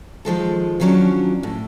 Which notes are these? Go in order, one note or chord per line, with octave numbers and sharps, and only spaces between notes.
D#3 F3 G#3 A4
D#3 F3 F#3 A3 C#4 D4
A2